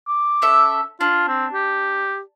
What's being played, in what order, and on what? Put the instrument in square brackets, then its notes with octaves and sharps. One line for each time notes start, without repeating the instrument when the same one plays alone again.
[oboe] D6
[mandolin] C#4 A4 E5
[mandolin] D4 [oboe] F4
[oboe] C4
G4